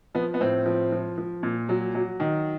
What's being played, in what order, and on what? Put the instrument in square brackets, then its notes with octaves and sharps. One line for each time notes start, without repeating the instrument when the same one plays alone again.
[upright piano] F3 B3
B3
A2 C4
F3
F3
F3
A#2
F#3
F#3
D#3